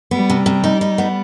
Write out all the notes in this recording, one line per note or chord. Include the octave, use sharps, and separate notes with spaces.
G3 B3
C3
C3
D#4
D#4
B3